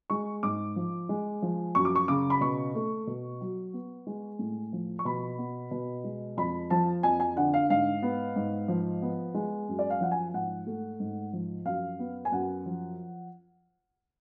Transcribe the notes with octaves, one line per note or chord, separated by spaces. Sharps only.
G#3 C#6
G#2 D6
F3
G#3
F3
F#2 C#6
D6
C#6
C#3 D6
B5
B2 C#6
A3
B2
F#3
B3
G#3
A2
F3
C#6
B2 B5
B3
B2
G#3
F2 B5
F3 A5
F2 G#5
G#5
D3 F#5
F5
G#2 F5
B3
G#2
F3
B3
G#3
F#2
D5
F5
F3 F#5
G#5
G#2 F#5
A3
G#2
F3
F#2 F5
B3
G#5
F#2 F#5
F3